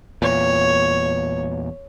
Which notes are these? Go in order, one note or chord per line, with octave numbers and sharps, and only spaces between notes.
E2 A#2 C#5